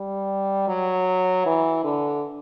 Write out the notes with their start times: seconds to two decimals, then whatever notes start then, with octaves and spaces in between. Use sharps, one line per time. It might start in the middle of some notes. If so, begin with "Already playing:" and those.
Already playing: G3
0.68 F#3
1.46 E3
1.84 D3